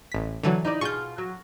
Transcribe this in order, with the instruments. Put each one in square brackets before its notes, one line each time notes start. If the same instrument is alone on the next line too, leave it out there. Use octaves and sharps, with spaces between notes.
[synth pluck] A1 B6
D3 E3 F#3
[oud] D#4 E4 D5
[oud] B2 F4 G#4 [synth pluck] C#6 G6
[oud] F#3